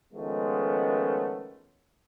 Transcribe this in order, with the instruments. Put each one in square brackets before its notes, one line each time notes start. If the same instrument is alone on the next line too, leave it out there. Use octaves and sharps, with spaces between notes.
[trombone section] D#3 F3 G#3 A3 B3 C#4